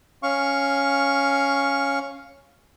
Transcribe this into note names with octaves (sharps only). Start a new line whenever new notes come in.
C#4 F5 C#6